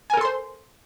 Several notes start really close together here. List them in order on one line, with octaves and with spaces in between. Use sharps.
G#5 A#4 A4 C6 C5